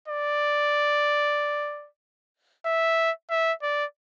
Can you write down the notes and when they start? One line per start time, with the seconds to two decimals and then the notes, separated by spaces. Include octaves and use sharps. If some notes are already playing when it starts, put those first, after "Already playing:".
0.08 D5
2.66 E5
3.30 E5
3.62 D5